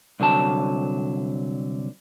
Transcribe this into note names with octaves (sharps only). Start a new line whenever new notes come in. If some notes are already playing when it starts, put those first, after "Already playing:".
C2 D3 F#3 A5